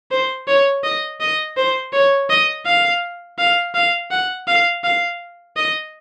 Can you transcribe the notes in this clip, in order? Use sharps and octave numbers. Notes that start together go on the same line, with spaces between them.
C5
C#5
D#5
D#5
C5
C#5
D#5
F5
F5
F5
F#5
F5
F5
D#5